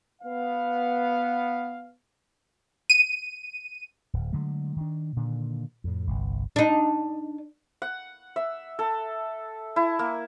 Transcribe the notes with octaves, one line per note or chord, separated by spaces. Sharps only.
B3 F5
D#7
D1
D3 F#3 G#3 A3
D#3 D4
A#2 D3 D#3 D4
F2 A2
G1 C2
D4 D#4
F#5
E5
A4
E4
A#3